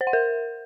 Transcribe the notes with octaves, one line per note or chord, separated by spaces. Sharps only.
C5
F#5
A#4